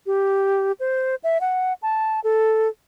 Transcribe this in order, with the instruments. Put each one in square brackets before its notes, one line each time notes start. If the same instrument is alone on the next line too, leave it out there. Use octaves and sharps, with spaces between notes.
[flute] G4
C5
E5
F#5
A5
A4